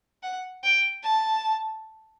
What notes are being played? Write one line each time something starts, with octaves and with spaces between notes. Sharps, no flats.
F#5
G5
A5